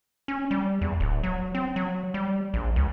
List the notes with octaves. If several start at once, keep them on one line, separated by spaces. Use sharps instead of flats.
C#4
G3
E2
D1
F#3
C4
F#3
G3
A#1
C#2